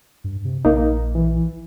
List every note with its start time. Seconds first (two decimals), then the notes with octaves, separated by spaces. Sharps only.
0.24 G2
0.45 C3
0.65 A#1 A#3 D#4
1.15 E3